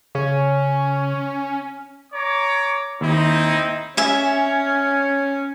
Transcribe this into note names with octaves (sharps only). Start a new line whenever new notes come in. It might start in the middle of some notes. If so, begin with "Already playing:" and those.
C#3 C#4
C#5 A#5 D6
D#2 C4 D#4 E4
C#4 E5 G#5